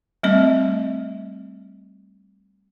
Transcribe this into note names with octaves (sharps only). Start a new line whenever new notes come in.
G3 A3 C4 D#5